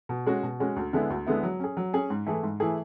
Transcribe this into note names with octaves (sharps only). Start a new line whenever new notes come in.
B2
G#3 C#4 F#4
B2
G#3 C#4 F#4
D2
D3 G#3 B3 E4
D2
D3 G#3 B3 E4
F#3
C#4 G#4
F#3
C#4 G#4
G#2
E3 A3 E4 G#4
G#2
E3 A3 E4 G#4